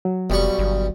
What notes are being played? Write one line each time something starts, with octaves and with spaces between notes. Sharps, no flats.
F#3
F1 B1 G3 C#6
G1